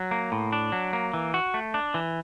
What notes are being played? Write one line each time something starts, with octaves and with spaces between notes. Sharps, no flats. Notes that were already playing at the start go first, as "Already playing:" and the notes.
Already playing: F#3
A#3
A2
D4
F#3
A#3
E3
F#4
A3
D4
E3